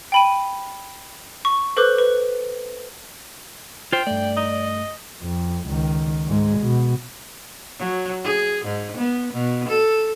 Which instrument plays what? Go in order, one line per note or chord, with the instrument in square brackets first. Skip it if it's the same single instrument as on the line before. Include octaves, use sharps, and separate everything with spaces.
[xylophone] G5 B5 D#7
C#6
A4 B4 C5 D6 F#6
B4
[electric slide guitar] F4 C5 [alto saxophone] G5
[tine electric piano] G2 A3 [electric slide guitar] D5
[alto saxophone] D#5
[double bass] F2
C#2 D#3
G#2 G#3
B2
[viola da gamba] F#3
G#4
G#2
B3
B2
A4